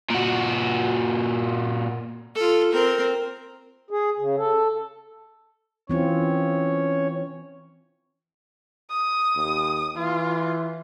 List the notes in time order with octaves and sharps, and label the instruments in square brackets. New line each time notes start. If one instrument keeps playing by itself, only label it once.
[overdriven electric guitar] A#2 F#4
[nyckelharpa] F4 A4
C4 A#4
[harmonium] G#4
C#3
A4
[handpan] E3 C4 F4 [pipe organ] C#4 C#5
[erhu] D#6
[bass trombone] D#2
[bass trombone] E3 [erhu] F4